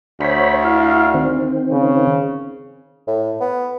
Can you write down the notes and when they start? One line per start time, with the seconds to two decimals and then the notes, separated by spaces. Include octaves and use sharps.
0.21 D2 C5 C#5 B5
0.65 E4 F5
1.14 D#3 C4
1.71 C#3
3.07 A2
3.40 B3